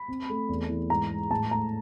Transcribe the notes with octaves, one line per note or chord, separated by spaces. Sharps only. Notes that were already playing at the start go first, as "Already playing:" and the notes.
Already playing: B5
C4
A3
E2
E3
G#2 A#5
G#3
A2 A5
A3 A#5